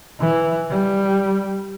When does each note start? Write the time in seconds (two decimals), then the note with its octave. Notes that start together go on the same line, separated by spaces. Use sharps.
0.20 E3
0.71 G3